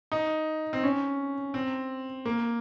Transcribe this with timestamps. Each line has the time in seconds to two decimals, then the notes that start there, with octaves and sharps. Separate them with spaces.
0.12 D#4
0.73 C4
0.83 C#4
1.54 C4
2.25 A#3